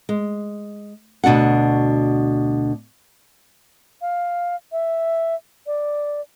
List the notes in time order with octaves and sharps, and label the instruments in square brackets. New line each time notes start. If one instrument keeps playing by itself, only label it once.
[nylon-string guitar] G#3
D2 B2 D4 F#4 F#5
[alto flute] F5
E5
D5